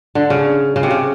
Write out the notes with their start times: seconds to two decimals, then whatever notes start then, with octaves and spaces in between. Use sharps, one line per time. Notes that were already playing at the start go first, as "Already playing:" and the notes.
0.15 D3
0.30 C#3
0.76 C#3
0.83 C3
0.91 C#3